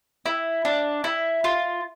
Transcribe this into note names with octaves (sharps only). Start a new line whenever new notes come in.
E4
D4
E4
F4